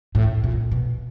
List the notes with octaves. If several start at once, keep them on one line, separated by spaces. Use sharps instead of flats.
A2
A#2
B2